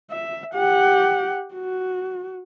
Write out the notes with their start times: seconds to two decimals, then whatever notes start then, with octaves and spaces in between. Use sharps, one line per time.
0.11 E5
0.54 G4 F#5
1.55 F#4